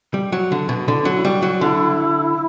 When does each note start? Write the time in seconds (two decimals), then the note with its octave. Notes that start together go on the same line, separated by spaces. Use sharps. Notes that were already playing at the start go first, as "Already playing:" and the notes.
0.14 G3
0.32 F#3
0.52 D3
0.69 B2
0.88 D3 E4
1.00 C#4
1.05 F#3 D4
1.16 E4
1.25 G3 F#4
1.42 F#3
1.61 D3 E4